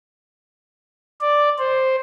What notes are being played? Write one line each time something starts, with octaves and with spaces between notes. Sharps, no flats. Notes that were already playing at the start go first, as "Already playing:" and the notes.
D5
C5